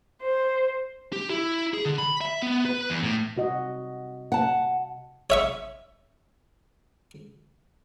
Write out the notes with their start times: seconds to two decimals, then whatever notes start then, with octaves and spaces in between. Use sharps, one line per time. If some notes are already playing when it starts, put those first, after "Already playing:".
0.22 C5
1.13 G4
1.30 E4
1.74 G#4
1.85 D3
1.98 B5
2.21 E5
2.43 B3
2.65 B4
2.90 E2
3.03 A2
3.36 C3 F#4 D#5
4.32 F#5 A5
5.30 C#5 E5 C#6